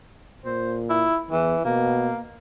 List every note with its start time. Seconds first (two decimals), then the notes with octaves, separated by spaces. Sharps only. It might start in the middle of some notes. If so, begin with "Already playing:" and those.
0.45 A#2 C5
0.90 E4
1.31 E2 E3
1.65 B2 A#3